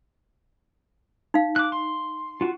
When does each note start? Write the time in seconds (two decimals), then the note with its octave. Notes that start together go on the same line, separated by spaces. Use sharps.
1.34 D#4 F5
1.56 D6 F#6
1.72 C6
2.41 F4 F#4